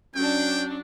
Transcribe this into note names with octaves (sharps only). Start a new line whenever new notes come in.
F#3 C#4 D4 G5